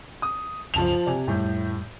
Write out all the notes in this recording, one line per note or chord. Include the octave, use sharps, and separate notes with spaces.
D#6
C2 F#2 C#3 F3 A5 F7
C3 D5 G#5
F2 A2 G3 G6